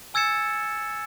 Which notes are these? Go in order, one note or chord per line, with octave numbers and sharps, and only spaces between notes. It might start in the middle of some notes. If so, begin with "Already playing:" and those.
G#5 E6 G#6 A6 C#7 E7